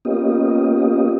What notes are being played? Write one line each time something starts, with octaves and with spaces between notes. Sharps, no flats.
A#3 B3 C#4 F4 G4 D#5